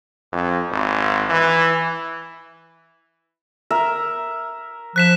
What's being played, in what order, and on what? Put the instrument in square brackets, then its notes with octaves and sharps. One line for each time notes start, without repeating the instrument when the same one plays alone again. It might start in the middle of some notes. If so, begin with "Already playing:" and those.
[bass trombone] F2
G#1
E3
[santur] A#4 E5
[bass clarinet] F3 [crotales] F#6 B6 E7